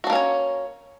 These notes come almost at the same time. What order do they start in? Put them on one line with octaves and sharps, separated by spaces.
F#4 D4 A#3 C#4 C#5